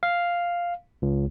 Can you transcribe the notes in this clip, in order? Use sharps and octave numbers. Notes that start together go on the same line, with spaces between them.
F5
C#2